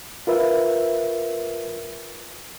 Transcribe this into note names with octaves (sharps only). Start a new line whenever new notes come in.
F4 A#4 B4 E5